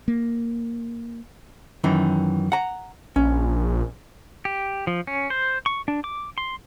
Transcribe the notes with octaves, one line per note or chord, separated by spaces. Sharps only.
A#3
F#2 D#3 E3
F#5 A#5
A#1 C#4
G4
F3
C#4
C5
C#6
D4
D6
C6